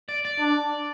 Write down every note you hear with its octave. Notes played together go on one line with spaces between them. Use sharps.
D5
D5
D4